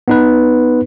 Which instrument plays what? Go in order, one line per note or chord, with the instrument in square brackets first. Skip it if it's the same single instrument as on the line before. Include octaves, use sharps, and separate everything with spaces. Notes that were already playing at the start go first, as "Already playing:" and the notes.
[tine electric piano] B3 D#4 B4